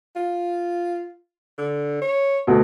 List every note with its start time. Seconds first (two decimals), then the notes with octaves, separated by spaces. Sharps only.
0.16 F4
1.58 D3
2.02 C#5
2.47 D2 B2